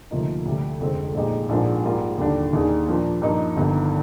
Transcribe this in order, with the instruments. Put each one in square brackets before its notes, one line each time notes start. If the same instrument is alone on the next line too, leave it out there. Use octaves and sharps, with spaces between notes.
[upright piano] D2 C3 F3 A#3 D#4
D2 C3 G3
F1 F2 D3 G#3 C4
A#1 A#2 G#3 D#4 G4
A#1 G#2 F3 A#3 D4
G#2 G3 A#3 F4 A#4
D#2 D3 G3 D4
D#2 D#3 A#3 D4 G#4
A#2 F3 A#3 D4
G2 F3 A#3 D#4
G1 G2 D#3